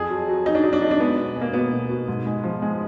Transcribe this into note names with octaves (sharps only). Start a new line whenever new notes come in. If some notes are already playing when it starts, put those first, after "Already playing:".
Already playing: F2 G#4
F#3
F#3
F2 D#4
D4
F#3 D#4
D4
F#3 D#4
D4
G#3 B3
B2
G#3
A#3
B2 B3
B2
B2
G#2
G#3
F3
G#3